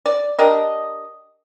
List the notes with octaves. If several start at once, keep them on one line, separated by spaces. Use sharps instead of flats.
D5
D4 G4 A#4 D#5